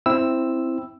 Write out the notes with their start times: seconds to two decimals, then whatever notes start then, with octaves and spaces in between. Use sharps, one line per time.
0.06 C4 E4 E6